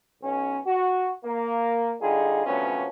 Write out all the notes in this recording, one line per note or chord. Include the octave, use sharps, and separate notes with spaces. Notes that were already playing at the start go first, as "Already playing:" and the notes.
B1 C#4
F#4
A#3
D3 G3 D#4 F4 G#4
D2 C3 F3 F#3 B3 C#4